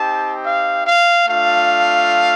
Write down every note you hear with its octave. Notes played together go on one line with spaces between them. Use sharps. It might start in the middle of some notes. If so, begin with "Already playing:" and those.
Already playing: C4 D#4 G4 A5
F5
F5
A3 D4 F4 F5